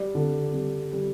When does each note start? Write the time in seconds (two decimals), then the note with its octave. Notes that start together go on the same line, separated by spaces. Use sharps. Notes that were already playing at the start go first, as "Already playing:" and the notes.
Already playing: G3 D5
0.15 D3
0.54 G3
0.93 G3